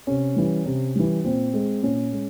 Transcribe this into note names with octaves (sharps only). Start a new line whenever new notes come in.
C3 C#4
E3 G3
C3
E3 G3
A#2 C4
G#3
A#2 C#4
G#3